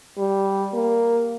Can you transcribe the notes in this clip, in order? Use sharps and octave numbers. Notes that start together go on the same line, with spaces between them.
G3
A#3